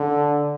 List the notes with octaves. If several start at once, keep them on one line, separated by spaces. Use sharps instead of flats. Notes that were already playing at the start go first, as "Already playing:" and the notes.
Already playing: D3